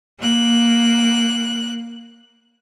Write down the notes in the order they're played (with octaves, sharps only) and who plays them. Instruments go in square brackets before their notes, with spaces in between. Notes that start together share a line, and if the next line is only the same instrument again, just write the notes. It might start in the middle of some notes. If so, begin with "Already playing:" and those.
[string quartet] A#3 F#6